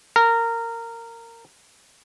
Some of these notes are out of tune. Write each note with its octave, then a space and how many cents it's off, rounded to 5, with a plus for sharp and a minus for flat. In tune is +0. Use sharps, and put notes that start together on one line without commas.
A#4 -15